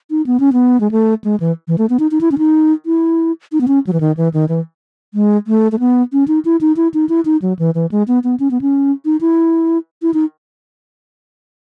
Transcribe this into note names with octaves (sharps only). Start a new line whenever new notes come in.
D#4
B3
C#4
B3
G#3
A3
G#3
E3
E3
A3
B3
D#4
D#4
E4
C#4
D#4
E4
D#4
B3
C#4
F#3
E3
D#3
E3
D#3
E3
G#3
A3
A3
B3
C#4
D#4
E4
D#4
E4
D#4
E4
D#4
F#3
E3
E3
G#3
B3
B3
C#4
B3
C#4
D#4
E4
E4
D#4